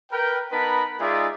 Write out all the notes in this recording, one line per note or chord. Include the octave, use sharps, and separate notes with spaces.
A#4 B4 G5
B3 D#4 A#4 B4 A5 B5
G#3 D#4 F4 G#4 D5 E5